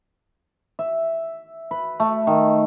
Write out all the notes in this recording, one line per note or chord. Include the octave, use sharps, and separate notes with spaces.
E5
B4
A3
D#3